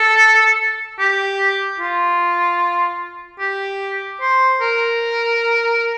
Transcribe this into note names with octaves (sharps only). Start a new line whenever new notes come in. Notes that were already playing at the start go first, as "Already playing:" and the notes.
Already playing: A4
G4
F4
G4
C5
A#4